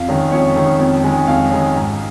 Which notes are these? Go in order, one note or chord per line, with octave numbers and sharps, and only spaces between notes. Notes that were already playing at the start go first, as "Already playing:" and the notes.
Already playing: F2 F5
D#3 G#3 C#4
F2 C#5
D#3 G#3 C#4
F2
D#3 G#3 C#4
F2 F5
D#3 G#3 C#4
G#2